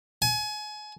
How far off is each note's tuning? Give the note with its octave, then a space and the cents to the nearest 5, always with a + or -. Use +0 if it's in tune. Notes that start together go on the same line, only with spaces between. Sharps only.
G#5 +30